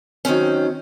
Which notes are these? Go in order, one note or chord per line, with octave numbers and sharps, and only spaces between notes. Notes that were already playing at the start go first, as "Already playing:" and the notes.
D#3 F#3 C4 C#4